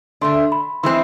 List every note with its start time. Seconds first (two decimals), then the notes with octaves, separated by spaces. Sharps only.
0.21 D3 A3 D4 C6
0.52 B5
0.83 E3 G#3 C4 C6